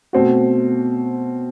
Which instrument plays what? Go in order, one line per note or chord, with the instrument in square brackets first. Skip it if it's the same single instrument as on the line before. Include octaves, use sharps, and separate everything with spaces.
[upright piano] B2 A3 C4 F#4